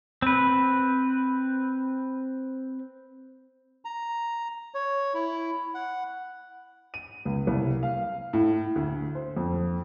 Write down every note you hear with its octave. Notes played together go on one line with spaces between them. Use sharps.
C4 B4
A#5
C#5
E4
F#5
D#7
C#2
C2
F5
A2
D2
C5
F2